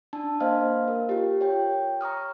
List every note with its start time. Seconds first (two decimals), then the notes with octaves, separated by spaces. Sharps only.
0.13 D4 A5
0.40 A#3 C5 D#5 F5 F6
0.88 A#4
1.09 F4 G4
1.41 C#5 G5
2.01 A#5 C#6 D#6 F6